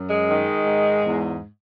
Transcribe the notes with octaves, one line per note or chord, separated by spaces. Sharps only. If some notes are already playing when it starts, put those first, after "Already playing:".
Already playing: F#2
G#3
D#3
G#2
E2